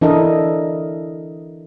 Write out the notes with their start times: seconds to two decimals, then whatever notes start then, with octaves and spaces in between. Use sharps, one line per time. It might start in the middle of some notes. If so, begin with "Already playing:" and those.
0.01 E3 D4 E4 A4 A#4 D#5